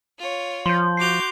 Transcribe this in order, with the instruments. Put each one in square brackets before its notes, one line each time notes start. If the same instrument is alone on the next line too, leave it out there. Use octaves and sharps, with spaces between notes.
[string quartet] F4 C#5
[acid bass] F3 [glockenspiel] C6 G6
[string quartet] F#4 D6 G6 [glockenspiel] C7 F7